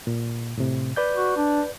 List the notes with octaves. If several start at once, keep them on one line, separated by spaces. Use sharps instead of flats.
A#2
A2 C3
B4 D5 G6
F#4
D4